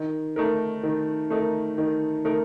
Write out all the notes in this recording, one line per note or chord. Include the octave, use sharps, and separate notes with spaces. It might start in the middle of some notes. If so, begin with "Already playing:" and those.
Already playing: D#3
A3 D#4 A#4
D#3
A3 D#4 A#4
D#3
A3 D#4 A#4